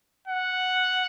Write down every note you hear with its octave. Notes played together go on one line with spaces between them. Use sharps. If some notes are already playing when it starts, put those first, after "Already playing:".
F#5